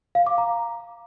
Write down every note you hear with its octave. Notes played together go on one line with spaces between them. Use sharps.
F5
D6
A#5